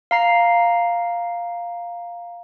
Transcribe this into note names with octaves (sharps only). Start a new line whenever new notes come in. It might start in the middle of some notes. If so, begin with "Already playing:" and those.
F5 A#5 C7